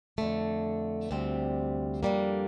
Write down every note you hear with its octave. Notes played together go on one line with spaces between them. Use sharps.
F2 D3 A3
D2 C3 G3 C4
F2 D3 G3 A#3